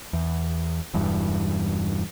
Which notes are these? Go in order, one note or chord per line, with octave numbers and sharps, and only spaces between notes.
E2
E1 E2 G2